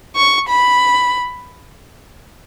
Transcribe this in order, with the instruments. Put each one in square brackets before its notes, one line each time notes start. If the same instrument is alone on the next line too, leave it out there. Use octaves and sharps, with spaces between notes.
[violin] C#6
B5